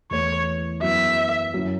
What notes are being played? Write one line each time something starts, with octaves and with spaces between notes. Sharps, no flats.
E2 E3 A3 C#5
F#2 F#3 B3 E4 E5
F#2 F#3 C#4 E4